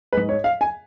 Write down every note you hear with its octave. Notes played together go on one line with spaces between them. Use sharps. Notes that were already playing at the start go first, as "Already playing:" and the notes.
G#2 G#3 B4
C#5
F5
G#5